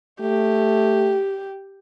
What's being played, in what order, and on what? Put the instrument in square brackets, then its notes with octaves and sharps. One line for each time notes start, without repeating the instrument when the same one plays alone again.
[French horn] A3 [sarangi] G4